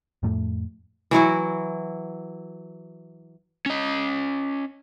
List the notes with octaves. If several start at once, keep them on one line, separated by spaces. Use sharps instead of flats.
F2 A2 A3
E3 F#3 E4 F#4
C#4 D#5